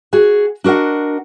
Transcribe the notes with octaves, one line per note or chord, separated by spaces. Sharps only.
F#4 G#4
D4 F#4 A#4 D#5 F#5